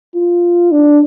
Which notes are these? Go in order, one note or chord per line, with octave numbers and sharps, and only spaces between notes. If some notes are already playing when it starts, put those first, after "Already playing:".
F4
D4